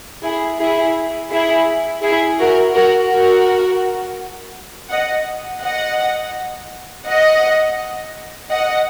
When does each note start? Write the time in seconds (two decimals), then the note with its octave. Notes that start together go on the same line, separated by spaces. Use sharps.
0.22 E4 G#4
0.59 E4 G#4
1.31 E4 G#4
2.02 E4 G#4
2.39 F#4 A#4
2.75 F#4 A#4
3.11 F#4 A#4
4.90 D#5 F#5
5.62 D#5 F#5
7.06 D#5 F#5
8.50 D#5 F#5